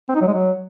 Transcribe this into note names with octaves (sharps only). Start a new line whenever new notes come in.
C4
D#4
F#3
G#3
F#3